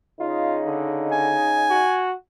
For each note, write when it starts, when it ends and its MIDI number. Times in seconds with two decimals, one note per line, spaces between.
0.20 1.83 49
0.20 1.83 63
0.20 0.60 65
0.66 1.38 50
1.12 2.12 80
1.70 2.14 66